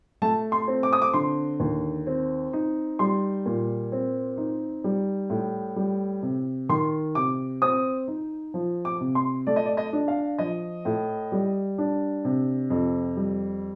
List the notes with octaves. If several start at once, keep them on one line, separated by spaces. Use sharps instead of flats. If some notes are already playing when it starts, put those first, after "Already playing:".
A3 A5
C6
C4
D6
D#6
D6
D3 C6
D#2
C4
D#4
G3 C6
A#2
C4
D#4
G3
A2
G3
C3
D#3 C6
C3 D6
C4 D#6
D#4
F3
D6
C3
C6
A3 D5
D#5
D5
D#5
D4
F5
F3 D#5
A2
G3
D4
C3
F2
G3